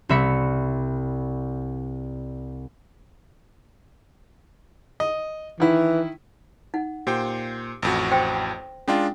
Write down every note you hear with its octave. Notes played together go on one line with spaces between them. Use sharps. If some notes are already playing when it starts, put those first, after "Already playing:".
C2 G3 E5 B5 A#6 C#7
D#5
D#3 E3 E4
D#4 F#5
A#2 G4 C5 G5
A1 F2 F#4
C5 G5 C6
G#3 C#4 D4 F4 C6 C#6